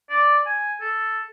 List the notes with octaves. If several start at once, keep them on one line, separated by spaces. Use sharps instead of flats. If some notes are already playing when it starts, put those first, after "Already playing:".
D5
G#5
A4